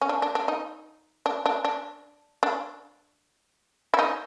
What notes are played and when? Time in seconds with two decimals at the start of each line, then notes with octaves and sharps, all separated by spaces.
0.01 C#4
0.09 D4
0.22 D4
0.35 D4
0.48 D#4
1.26 D4
1.46 D4
1.65 D4
2.43 D4
3.94 E4
3.99 D#4